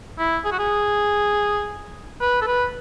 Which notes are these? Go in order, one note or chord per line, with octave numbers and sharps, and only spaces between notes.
E4
G#4
F#4
G#4
B4
A4
B4